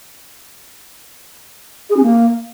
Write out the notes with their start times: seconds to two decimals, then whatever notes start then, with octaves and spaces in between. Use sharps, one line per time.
1.90 G#4
1.96 C#4
2.03 A#3